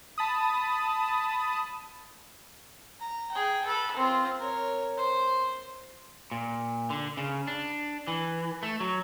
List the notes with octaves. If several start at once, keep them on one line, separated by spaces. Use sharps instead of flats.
A5 B5 D#6
A#5
G#4 G5
A4 B4
C4 F4
A#4 C#5
C5
A#2
D3
C#3
D4
E3
A3
F#3